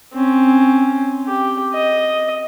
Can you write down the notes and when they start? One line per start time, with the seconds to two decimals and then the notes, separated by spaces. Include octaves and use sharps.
0.13 C4 C#4
1.26 G4
1.73 D#5